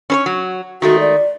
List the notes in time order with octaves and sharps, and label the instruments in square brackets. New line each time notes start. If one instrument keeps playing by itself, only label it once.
[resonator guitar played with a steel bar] C#4 C5 C#5
F#3
[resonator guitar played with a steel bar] D#3 G#3 A3 [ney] F#4
[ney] D5